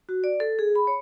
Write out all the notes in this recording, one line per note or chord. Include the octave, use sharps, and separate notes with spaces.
F#4
D5
A4
G#4
B5
C#5